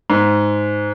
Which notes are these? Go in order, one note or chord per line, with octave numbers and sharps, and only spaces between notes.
G#2